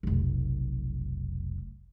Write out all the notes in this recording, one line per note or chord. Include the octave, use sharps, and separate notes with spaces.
F1 B1